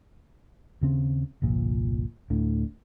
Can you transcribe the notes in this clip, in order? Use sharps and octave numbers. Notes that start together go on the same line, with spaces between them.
D#2 C#3 C4
G1 C2 A#2 F3
D2 A2 D3